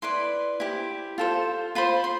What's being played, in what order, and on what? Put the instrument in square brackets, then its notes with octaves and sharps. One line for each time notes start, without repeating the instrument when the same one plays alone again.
[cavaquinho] E4 B4 D5 C6
E4 G4 C5
F4 A4 C5
F4 C5 B5
C6